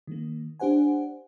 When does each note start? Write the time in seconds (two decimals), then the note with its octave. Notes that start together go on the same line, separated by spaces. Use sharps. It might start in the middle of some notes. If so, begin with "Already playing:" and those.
0.07 D#3 A#3
0.60 D4 G4 C5 F#5 G#5